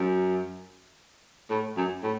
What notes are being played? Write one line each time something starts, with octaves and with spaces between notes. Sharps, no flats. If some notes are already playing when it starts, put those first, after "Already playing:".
Already playing: F#2
A2
F#2
A2